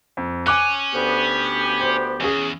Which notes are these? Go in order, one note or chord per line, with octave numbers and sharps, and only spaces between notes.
F2
C#4 G#5 D6 F#6
D2 B3 G4
C5
E2 C#4 G#4